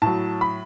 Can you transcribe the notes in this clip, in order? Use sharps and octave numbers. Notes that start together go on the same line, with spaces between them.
A2 F#3 A5
B5